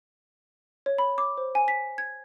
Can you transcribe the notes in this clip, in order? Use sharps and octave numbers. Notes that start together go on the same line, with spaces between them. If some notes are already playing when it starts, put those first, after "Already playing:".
C#5
B5
D6
C5
G#5
B6
G#6